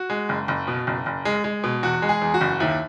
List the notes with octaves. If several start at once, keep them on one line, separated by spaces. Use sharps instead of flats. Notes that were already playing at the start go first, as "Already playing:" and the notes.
Already playing: F#4
G#3
F#1
F#1
B2
F#1
F#1
G#3
G#3
B2
E2 F#4
G#3
G#4
E2
F#4
F#1
D#2 E4